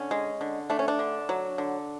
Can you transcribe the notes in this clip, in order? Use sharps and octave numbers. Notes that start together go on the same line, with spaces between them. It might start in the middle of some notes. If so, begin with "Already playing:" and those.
Already playing: D3 C#4
G#3
D3
A3 D4
C#4
D4
D3
F#3
D3